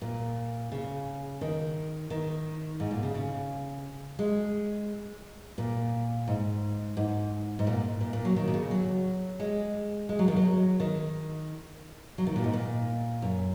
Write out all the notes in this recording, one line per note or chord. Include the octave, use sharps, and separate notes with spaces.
A#2
C#3
D#3
D#3
G#2
A#2
C#3
C#3
G#3
A#2
G#2
G#2
G#2
A#2
A#2
A#2
F#3
D#3
A#2
C#3
F#3
G#3
G#3
F#3
D#3
F#3
D#3
F#3
D#3
A#2
G#2
A#2
F#2